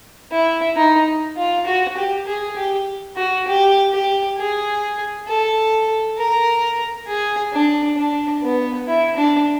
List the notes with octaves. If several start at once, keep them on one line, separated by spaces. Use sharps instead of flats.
E4
D#4
F4
F#4
G4
G#4
G4
F#4
G4
G4
G#4
A4
A#4
G#4
D4
D4
B3
E4
D4